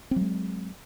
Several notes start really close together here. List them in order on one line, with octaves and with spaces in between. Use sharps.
C4 F#3 G#3